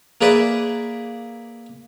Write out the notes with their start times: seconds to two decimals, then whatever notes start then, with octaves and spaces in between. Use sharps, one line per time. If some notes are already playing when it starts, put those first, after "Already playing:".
0.21 A#3 G#4 B4 D5 E5